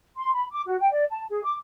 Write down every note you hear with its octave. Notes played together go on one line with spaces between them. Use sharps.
C6
B5
D6
F#4
G5
D5
A5
G#4
D6